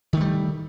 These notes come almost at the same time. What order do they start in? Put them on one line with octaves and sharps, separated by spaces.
D#3 A3 G3